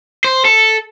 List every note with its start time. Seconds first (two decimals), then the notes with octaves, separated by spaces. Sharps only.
0.24 C5
0.45 A4